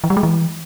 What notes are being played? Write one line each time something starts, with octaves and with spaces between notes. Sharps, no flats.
E3
G3
G#3
E3